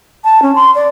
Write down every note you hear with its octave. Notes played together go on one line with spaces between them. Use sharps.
A5
C#4
C6
D5